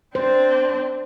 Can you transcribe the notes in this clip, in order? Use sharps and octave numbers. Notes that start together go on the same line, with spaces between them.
C4 D4 C5